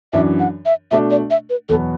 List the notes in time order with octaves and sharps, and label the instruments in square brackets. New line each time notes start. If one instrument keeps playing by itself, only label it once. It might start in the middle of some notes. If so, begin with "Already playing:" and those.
[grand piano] F#2 E3 D4 [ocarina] E5
[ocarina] F#5
E5
[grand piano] B2 A3 D4 [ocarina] E5
[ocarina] D5
E5
B4
[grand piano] E2 B2 F#3 B3 [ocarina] A4